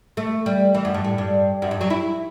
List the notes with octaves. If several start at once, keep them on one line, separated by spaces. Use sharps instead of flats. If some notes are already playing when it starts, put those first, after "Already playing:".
A3
G3
E3
F#2
G2
A2
G2
F#2
G2
F#3
E4